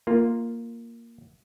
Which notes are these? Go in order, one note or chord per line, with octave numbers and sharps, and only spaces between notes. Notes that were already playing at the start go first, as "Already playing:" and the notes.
A#3 F4